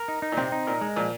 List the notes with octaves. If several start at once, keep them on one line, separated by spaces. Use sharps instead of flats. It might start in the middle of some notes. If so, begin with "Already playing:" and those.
Already playing: A#4
D#4
D#4
A#2
C3 C4
D#4
A#2 A#4
G#3
A#2 F3